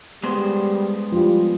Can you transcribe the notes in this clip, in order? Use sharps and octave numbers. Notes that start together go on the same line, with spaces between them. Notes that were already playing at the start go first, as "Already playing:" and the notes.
G3 G#3 B3 C5
F3 G3